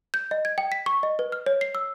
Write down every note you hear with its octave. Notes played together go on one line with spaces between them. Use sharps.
G6
D#5
G#6
G5
B6
C#6
D#5
B4
F6
C#5
C7
E6